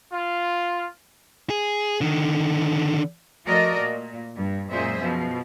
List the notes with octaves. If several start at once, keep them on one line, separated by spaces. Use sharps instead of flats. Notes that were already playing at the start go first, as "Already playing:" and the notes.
F4
G#4
D3 D#3
F3 A3 F#4 A#4 D5 D#5
A#2
G2
F#2 A#2 G#3 G#4 C5 E5
B2 F3